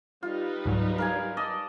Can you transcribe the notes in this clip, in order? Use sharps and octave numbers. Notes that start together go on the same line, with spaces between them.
G3 D#4 F4 B4
C#2 G#2 F#3
A#4 F5 G#5
D5 D#5 A5